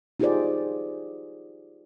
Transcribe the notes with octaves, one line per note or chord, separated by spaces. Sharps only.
D#4 F4 G4 G#4 C5 D5